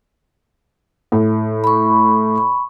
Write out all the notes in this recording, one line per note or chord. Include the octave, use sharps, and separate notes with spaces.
A2
B5 C#6